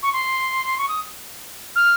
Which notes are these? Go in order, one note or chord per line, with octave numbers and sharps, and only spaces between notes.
C#6
C6
C#6
D#6
F6